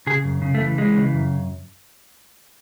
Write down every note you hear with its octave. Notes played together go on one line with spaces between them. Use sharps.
C#3 G#4
F#2
C#3
A3
E3
E3 G#3
C#3
F#2